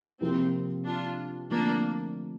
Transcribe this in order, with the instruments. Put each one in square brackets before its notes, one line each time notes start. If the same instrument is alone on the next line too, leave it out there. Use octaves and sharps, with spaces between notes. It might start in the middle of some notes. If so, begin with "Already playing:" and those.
[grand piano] C3 F3 A#3 F4 [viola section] C4
[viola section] D4 F4
[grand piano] D3 F3 A3 C4 F4 [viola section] A#3 D4